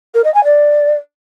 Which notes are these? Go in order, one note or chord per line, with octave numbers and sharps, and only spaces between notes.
A#4
D#5
G#5
D5